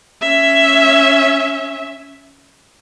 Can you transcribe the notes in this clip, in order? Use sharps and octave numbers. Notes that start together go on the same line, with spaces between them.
C#4 E5